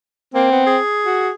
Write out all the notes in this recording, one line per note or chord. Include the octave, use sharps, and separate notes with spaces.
A#3 C4
B3
G#4
F#4